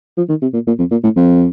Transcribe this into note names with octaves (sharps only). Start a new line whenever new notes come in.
F3
D#3
C3
A#2
A#2
F2
A#2
A2
F2